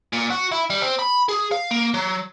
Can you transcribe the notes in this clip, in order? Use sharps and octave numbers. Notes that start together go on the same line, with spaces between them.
A#2
F#4
E4
G3
C4
B5
G#4
F5
A#3
F#3